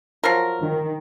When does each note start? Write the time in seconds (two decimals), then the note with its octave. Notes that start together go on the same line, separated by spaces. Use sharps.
0.24 F3 F#3 A#4
0.61 D#3